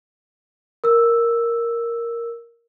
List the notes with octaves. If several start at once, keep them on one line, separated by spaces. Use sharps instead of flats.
A#4 E6